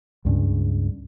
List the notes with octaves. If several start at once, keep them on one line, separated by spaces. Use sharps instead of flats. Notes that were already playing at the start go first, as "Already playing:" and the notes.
C#2 G2 C#3